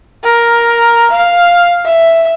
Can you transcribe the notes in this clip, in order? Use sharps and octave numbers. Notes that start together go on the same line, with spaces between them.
A#4
F5
E5